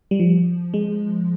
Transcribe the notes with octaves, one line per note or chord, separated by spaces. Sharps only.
G3
F3
G#3